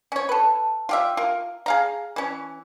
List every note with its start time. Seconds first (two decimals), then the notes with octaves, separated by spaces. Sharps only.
0.12 C#4 C#5
0.29 A4 B4
0.89 F4 G4 E5
1.17 F4 A#4
1.66 G#4 F5 A#5
2.16 E3 C#4